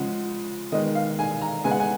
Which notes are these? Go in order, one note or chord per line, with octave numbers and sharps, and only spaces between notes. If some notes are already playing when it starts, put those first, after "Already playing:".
Already playing: C#3 F3 G#3 F#5
D#3 G#3 B3 D#5
F5
G#5
A#5
C#3 G#3 B3 G#5
F#5
G#5